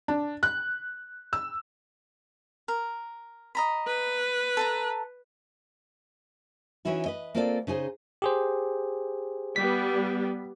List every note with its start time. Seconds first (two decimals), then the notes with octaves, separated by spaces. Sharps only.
0.08 D4
0.43 F#6
1.33 E6
2.68 A#4
3.55 D#5 A#5 B5
3.87 B4
4.57 A4 A5 A#5
6.85 E3 C#4 D#4 E4 F#4
7.06 B4 D#5
7.35 A#3 C4 E4 F4 A4 D5
7.67 C#3 D#4 G#4 C5
8.22 G4 G#4 C5
9.56 G3 B3 B6